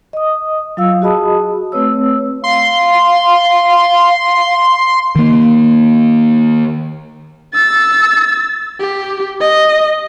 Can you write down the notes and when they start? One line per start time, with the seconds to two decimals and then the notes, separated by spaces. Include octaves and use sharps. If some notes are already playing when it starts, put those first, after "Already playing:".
0.13 D#5 D#6
0.77 F#3 F4 F5 E6
1.02 F#4 G#4 D#5 A5 B5 D#6
1.72 A3 C4 B4 C#5 E6
2.44 F5 C6
5.16 D#3 A#3
7.54 E6 A6
8.80 G4
9.41 D#5